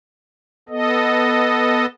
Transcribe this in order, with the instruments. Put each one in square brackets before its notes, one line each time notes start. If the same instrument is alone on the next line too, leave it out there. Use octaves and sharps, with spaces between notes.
[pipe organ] B3 A4 D#5